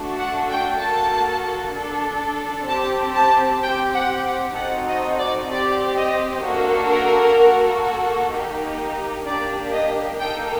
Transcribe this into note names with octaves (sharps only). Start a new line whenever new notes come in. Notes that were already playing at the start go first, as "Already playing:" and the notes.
Already playing: A3 D4 F#4 A4
F#5
G5
A#3 F#4 A4 A5
D4 A4
C4 G4 A5
A5
C4 G4 G5
F#5
F#5
C4 D#4 F#4 A4 F#5
D#5
D5
C4 G4 D5
D#5
A#3 D4 F#4 A4
A#4
A#3 F#4 A4
A#3 D#4 G4
A#3 D4 G4 D5
D#5
A#3 D#4 A4 G5